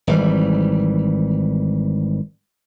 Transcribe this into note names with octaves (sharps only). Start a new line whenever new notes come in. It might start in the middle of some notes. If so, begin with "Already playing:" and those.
G#1 E3 G3